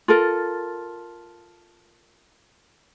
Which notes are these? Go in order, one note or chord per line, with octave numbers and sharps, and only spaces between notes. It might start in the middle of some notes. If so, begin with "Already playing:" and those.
F4 A4 A#4